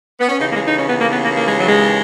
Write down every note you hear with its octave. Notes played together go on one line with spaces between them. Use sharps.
B3
C#4
D#2 C#3 E3 D#4
A#3
G#3
D#4
C#4
B3
A#3
B3
A#3
A#3
G#3
F#3
G#3